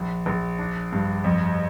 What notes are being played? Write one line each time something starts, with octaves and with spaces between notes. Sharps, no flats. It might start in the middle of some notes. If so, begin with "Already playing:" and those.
Already playing: A#1
A#1
D4
G2
F2